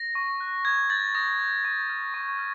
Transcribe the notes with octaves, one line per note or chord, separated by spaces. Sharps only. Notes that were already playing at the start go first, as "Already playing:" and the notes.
Already playing: A#6
C#6
F#6
D#6 G#6
G6 A6
D#6 A#6
G6
C#6
F6
C#6
F6